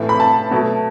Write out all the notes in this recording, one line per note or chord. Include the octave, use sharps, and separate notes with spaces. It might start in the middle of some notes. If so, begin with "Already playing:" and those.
Already playing: A2 E3 A3
B5
A5
B2 F#3 A3